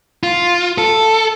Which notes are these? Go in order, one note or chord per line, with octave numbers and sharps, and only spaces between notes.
F4
A4